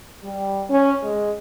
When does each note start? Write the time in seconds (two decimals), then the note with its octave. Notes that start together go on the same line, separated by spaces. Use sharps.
0.24 G3
0.70 C#4
1.03 G#3